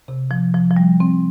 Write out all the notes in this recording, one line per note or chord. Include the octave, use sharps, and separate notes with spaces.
C3
F3
F3
F3
G3
C4